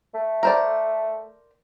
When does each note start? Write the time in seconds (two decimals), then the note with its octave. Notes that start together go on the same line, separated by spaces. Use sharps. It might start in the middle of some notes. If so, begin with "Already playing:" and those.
0.14 A3
0.43 A#4 C5 D5